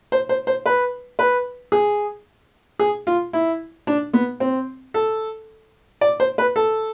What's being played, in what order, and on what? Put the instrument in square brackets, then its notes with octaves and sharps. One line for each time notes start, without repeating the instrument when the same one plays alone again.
[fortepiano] C5
C5
C5
B4
B4
G#4
G#4
F4
E4
D4
B3
C4
A4
D5
C5
B4
A4